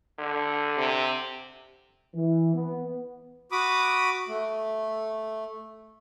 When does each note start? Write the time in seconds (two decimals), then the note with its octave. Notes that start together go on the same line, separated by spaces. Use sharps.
0.19 D3
0.77 C3
2.14 E3
2.54 B3
3.52 F#4 B5 D6 D#6
4.28 A3